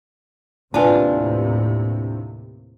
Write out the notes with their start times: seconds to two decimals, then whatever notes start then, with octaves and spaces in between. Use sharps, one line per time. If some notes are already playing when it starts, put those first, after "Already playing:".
0.74 D#2 A2 C3 D4 F4 B4 G#5 A5